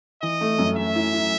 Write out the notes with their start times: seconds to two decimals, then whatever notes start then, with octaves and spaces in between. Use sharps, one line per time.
0.22 E3 D#5
0.41 A3
0.58 F#2
0.77 A3 E5
0.95 E4
1.14 E4